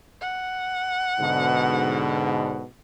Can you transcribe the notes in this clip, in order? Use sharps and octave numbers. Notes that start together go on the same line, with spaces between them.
F#5
G#2 B2 D3